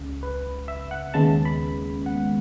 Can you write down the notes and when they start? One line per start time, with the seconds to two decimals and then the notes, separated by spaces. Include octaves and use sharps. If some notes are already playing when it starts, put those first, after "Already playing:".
Already playing: C#2 C#3
0.23 B4
0.68 E5
0.91 F#5
1.14 D#2 C#3 G#3 B3 A5
1.45 B5
2.06 F#5